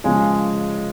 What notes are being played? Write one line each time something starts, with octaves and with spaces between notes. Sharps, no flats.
C#3 F3 G#3 C#4